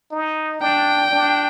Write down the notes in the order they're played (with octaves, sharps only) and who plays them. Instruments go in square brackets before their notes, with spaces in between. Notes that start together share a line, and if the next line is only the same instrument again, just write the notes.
[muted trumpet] D#4
[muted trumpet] D4 [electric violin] G5
[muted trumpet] D4